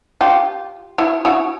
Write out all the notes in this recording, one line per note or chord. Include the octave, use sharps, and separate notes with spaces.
F4 G4
E4 F#4
E4 F#4